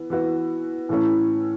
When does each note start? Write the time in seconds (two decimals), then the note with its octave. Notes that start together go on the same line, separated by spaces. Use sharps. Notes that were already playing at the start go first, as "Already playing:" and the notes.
Already playing: E3 B3
0.10 E3 B3 F#4
0.89 A2 E3 A3 C#4